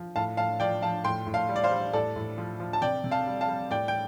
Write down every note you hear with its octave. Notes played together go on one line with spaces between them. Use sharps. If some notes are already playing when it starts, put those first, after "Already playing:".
Already playing: F3
A2 F5 A5
A2 F5 A5
F3 D5 G5
F3 F5 A5
A2 G5 C6
A2
F5 A5
G3
D5
C5 F5
G3
A2 A4 D5
A2
F3
F3
A5
C3 D5 G5
C3
F5 A5
G3
F5 A5
G3
A2 D5 G5
G5